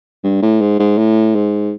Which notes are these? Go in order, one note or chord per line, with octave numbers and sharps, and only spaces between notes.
G2
A2
G#2
G#2
A2
G#2